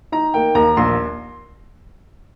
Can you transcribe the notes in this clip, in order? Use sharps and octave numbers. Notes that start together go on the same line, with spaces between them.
D#4 A#5
A#3 G5
D#2 A#5
A#1 C6